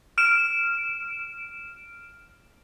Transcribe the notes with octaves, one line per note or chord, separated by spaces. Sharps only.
F6 D7 E7